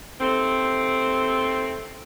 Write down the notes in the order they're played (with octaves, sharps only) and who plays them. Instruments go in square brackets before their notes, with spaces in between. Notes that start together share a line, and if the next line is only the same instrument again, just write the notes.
[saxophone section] D#2 A3 C4